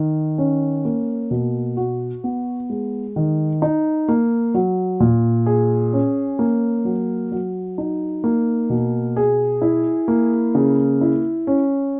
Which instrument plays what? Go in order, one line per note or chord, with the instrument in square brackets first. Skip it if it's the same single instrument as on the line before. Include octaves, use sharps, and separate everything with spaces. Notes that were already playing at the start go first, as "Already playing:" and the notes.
Already playing: [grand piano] D#3
C#4
A#3
B2
F#4
B3
G#3
D#3
D#4
A#3
F#3
A#2
G#4
C#4
A#3
F#3
F#3
D#4
A#3
B2
G#4
E4
A#3
C#3
E4
C#4